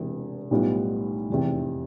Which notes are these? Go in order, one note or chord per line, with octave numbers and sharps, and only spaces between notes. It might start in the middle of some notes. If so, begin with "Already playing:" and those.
Already playing: E1 E2 C3
B1 A2 G3 B3 F4
F1 E2 C3